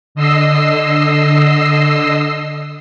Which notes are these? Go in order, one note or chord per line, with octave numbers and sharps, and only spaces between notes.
D3 D#5 E6 C7